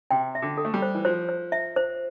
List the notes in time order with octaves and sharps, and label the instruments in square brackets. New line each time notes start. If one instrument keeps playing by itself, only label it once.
[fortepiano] C3 [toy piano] G5
[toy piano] E5
[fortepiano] D3
[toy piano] A4
[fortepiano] A3
G3
[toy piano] C5
[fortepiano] E3
[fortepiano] F3 [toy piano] C5
[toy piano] C5
E5
C5